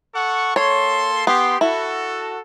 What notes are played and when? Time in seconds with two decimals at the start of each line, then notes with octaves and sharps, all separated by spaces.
0.15 A4 F#5 C#6
0.56 A#3 A4 C#5 C6
1.27 B3 G4 C6
1.61 E4 F#4 A4